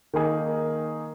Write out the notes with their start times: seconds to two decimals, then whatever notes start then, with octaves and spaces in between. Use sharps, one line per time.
0.13 D#3 A#3 D#4 G#4